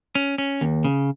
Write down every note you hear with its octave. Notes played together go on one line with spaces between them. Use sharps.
C#4
C#4
D#2
C#3